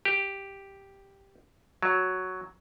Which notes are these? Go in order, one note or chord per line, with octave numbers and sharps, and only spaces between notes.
G4
F#3